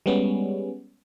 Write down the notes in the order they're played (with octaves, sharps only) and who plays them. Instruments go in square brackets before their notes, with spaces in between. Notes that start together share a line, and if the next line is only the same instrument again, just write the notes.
[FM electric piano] G3 G#3 B3 C#4